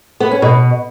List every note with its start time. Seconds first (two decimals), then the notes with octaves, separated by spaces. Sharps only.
0.20 B3
0.31 C#4
0.42 B2